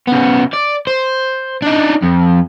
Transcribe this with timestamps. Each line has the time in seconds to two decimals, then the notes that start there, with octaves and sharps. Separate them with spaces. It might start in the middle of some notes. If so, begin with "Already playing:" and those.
0.07 C#3 B3
0.53 D5
0.87 C5
1.62 D4 D#4
2.02 F2